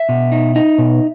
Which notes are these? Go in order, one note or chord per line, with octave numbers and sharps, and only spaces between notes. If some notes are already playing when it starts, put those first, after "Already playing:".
Already playing: E5
B2
D#4
D#4
B2